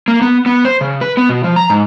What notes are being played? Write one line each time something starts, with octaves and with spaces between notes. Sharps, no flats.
A#3
B3
B3
C5
C#3
B4
B3
B2
F3
A#5
G#2